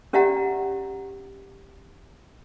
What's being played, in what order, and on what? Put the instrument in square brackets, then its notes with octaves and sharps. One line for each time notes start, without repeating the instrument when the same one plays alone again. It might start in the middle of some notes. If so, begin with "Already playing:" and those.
[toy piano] C#4 G4 D5 E5 F#5 A#5